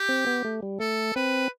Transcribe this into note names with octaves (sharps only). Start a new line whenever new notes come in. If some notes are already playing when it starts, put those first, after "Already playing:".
Already playing: G4
C4
B3
A3
G3
A3 A4
C4 B4